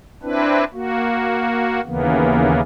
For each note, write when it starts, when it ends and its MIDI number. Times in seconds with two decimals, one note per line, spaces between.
0.23 0.64 60
0.23 0.64 62
0.23 0.64 64
0.23 0.64 71
0.73 1.81 58
0.73 1.81 66
1.86 2.61 39
1.86 2.61 49
1.86 2.61 52
1.86 2.61 58
1.86 2.61 59